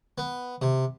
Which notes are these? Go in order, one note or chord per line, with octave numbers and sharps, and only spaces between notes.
B3
C3